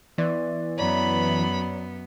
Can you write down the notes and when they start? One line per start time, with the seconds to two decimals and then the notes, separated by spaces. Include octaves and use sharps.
0.18 E3 B3 D5 C6
0.78 F#2 B3 C#5 D5 A#5 B5